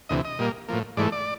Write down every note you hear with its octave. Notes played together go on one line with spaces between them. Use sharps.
D2 C3 E3 D#5
D#5
A#2 G3 A#3
A2 F3 A#3
G#2 E3 A3 D5
D5